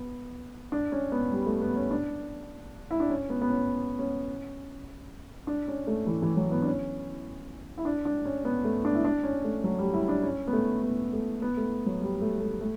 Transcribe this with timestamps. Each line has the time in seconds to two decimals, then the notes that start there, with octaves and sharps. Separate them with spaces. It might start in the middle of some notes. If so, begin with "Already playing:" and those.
Already playing: B3
0.72 D4
0.92 C#4
1.12 B3
1.31 G3
1.46 A3
1.62 B3
1.76 C#4
1.91 D4
2.91 E4
3.00 D4
3.10 C#4
3.30 B3
3.42 B3
3.49 C#4
3.99 C#4
5.47 D4
5.68 C#4
5.87 A3
6.07 E3
6.22 E3
6.37 F#3
6.51 B3
6.62 D4
6.67 C#4
7.78 E4
7.85 D4
8.05 D4
8.25 C#4
8.45 B3
8.64 A3
8.85 D4
8.95 E4
9.05 D4
9.23 C#4
9.44 A3
9.64 F#3
9.79 G3
9.94 E4
10.08 D4
10.23 C#4
10.47 B3
10.53 A3
10.82 B3
11.13 A3
11.42 B3
11.57 A3
11.86 F#3
12.02 G3
12.22 A3
12.40 A3
12.61 A3